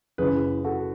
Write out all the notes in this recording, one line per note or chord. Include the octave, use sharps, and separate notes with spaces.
F#1 F#2 C#3 E3 G#4 B4
F#4 A4